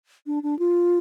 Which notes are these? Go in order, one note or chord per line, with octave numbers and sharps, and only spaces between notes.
D4
D4
F4